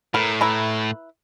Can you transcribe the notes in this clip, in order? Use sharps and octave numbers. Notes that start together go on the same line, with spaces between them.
A2 A#4 B4 A#5
E4 B4 A#5